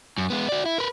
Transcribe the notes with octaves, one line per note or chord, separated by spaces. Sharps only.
F#2
G#3 B3
F#4 D5
E4
A#4 B4